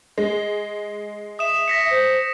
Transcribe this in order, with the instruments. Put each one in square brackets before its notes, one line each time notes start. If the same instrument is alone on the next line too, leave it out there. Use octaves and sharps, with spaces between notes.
[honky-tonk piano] G#3
[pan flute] E5 [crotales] D#6 E7
[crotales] A#6 B6 C#7
[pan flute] C5